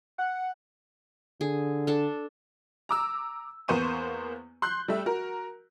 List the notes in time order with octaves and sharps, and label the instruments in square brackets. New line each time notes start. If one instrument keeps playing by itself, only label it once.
[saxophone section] F#5
[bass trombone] D3 [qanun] G#4
[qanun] D4 A4
[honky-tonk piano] A#5 D6 E6
E2 A#3 B3 C5 C#6 D#7
C6 F#6 G6
G3 A3 E5
F#4 A#4